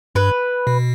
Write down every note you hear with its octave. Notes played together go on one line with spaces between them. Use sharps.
G2 B4
B2